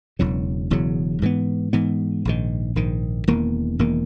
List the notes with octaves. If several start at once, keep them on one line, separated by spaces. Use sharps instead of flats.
E1 E2 C#3 F#3
E1 E2 C#3 F#3
G#2 E3 B3
G#2 E3 B3
A#1 G#2 D#3
A#1 G#2 D#3
E1 E2 D#3 A#3
E1 E2 D#3 A#3